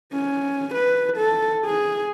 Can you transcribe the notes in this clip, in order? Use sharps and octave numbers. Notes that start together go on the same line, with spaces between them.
C#4
B4
A4
G#4